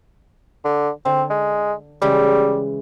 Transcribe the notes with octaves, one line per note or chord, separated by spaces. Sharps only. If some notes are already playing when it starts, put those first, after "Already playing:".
D3
D3 C4
G#3
C#3 E3 G3 G#3